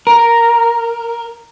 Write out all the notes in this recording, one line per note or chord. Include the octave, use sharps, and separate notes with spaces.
A#4